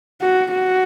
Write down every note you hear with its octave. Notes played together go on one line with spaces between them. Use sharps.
F#4
F#4